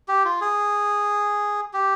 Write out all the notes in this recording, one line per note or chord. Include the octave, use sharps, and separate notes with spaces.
G4
F4
G#4
G4